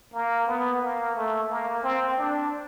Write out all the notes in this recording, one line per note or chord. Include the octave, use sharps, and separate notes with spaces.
A#3
B3
A#3
A3
A#3
C4
D4